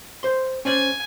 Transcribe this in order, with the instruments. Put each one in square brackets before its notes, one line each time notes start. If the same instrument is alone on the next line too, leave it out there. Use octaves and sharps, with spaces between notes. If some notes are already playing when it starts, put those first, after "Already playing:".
[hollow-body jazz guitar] C5 C6
[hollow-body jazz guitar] C#4 C5 D5 [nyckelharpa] G#5